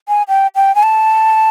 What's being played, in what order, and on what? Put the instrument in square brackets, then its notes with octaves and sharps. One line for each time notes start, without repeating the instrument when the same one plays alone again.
[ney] G#5
G5
G5
G#5
A5